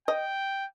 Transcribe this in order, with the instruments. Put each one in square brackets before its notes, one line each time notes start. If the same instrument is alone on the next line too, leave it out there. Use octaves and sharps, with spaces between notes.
[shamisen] D#5 [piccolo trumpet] G5